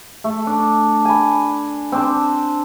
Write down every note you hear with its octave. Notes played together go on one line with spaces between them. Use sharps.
A3
D4
G#5 B5
C4 D4 C5